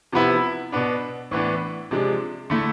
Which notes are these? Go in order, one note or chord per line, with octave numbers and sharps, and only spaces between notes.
C3 F3 B3 E4
B2 B3 D4
A2 E3 B3 D4
C3 F3 G#3 D4
D3 A3 E4